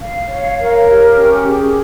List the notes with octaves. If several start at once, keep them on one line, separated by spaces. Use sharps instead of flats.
F5
C#5
A#4
G4
C#4
G#4